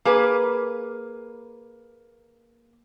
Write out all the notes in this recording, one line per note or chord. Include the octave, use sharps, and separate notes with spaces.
A#3 G#4 B4